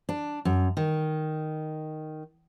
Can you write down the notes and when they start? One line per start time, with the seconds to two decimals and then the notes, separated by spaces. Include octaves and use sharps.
0.09 D4
0.45 F#2
0.77 D#3